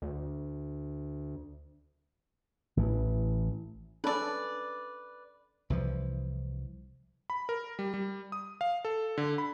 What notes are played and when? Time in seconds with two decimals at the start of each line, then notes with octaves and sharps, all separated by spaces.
0.02 D2
2.77 A1 E3
4.04 C#4 D4 A4 B4 D5
5.70 C2 E3 F3
7.30 B5
7.49 A#4
7.79 G3
7.94 G3
8.32 D#6
8.61 F5
8.85 A4
9.18 D3
9.38 B5